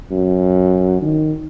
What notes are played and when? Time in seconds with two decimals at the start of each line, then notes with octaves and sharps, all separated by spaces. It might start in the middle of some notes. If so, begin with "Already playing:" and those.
0.12 F#2
1.02 D#3